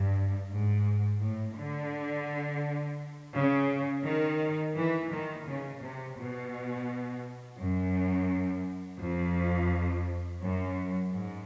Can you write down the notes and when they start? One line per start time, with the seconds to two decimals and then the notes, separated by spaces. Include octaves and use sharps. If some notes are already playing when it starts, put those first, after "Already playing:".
Already playing: G2
0.51 G#2
1.22 A2
1.57 D3
3.34 C#3
4.05 D#3
4.76 E3
5.11 D#3
5.47 C#3
5.82 C3
6.18 B2
7.59 F#2
9.01 F2
10.42 F#2
11.13 G#2